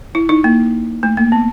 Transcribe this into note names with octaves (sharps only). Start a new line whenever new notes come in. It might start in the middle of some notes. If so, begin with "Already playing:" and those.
E4
D#4
A#3
A3
A#3
B3